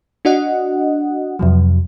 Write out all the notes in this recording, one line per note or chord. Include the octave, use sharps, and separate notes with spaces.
D4 F#4 D#5 F#5
F2 C3 F#3